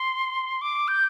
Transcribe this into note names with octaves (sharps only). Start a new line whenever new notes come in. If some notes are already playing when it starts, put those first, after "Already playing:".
Already playing: C6
D6
G6